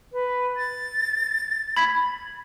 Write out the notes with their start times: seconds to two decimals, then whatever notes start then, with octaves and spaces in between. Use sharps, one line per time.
0.13 B4
0.57 A6
1.77 B5 G#6 B6